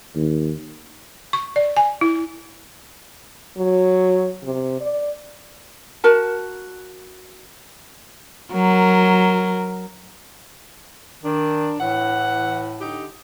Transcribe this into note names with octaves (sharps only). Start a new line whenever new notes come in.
D#2
C#6
D5
G#5
E4
F#3
C3
D5
F#4 A#4 A5
F#3 A#4
D#3 D4
A2 E3 F#5
D3 D#4 G4